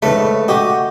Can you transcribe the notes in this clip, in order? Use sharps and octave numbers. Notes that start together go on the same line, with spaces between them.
G#2 C#3 A3 B4
F#4 G4 D#5